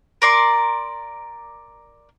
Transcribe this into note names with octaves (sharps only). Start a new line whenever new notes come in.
A#4 D5 C6